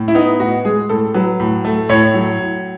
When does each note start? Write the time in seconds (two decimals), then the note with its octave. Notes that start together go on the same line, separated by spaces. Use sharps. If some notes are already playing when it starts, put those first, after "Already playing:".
Already playing: A2
0.08 E4
0.15 B3 D#4
0.40 A2 F#4
0.65 G#3 G#4
0.89 A2 A4
1.14 F#3 B4
1.40 A2
1.65 A3
1.89 A2 C#5
2.14 F#3
2.40 A2